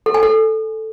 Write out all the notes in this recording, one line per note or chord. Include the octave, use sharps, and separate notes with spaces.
A4
G#5
A4